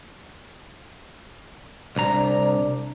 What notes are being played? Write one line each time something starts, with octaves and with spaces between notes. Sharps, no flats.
C2 D4 A#5